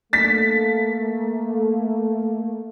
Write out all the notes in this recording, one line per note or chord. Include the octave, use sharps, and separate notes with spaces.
A3 A#3 A6 B6